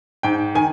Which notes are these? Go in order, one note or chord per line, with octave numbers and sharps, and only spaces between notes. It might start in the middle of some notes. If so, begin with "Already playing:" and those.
G#2 G5
D#3 G#5